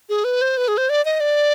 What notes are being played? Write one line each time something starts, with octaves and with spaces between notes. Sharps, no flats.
G#4
B4
C5
B4
G#4
C5
D5
D#5
D5